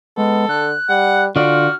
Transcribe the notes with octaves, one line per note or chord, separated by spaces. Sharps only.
G#3 B3 A4
D3 F#6
G3 F#5
D3 F4 F#4 D5 F6